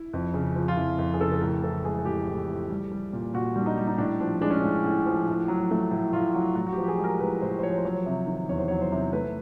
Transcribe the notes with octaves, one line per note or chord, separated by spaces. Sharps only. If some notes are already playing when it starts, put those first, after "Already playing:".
Already playing: E4
F2
C#3
F3
F4
F2 E4
F2
G#4
C#3 A4
A4
A2 A#4
E3 A4
G#3 G#4
G#4
A2 G4
A2
E3
G3
G3
A#2
A#2 F#4
G3
D4
D#4
G3
D#4
A2 D4
F3 D4
G#3 D4
C#4
A2 D4
A2
F3
A2
F#3
A3
A2 E4
A2 F4
F#3 F#4
A2 F#4
F#4
G4
F3
G4
G#4
G#3
A#4
A2 B4
A2 C5
C5
F3 C#5
C5
F#3 C#5
C3
D#3
E2 C#5
C5
F#3 C#5
C5
C3
A3 B4